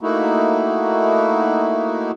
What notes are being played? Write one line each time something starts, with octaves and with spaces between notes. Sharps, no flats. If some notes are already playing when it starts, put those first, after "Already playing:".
A3 A#3 D#4 E4 F#4